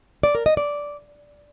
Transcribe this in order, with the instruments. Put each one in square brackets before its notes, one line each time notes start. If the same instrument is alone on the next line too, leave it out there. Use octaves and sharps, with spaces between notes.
[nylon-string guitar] D5
A#4
D#5
D5